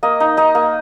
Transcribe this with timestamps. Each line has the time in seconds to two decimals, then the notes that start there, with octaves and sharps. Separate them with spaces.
0.03 A#3 D#5
0.20 D#4
0.37 D#4 D#5
0.55 A#3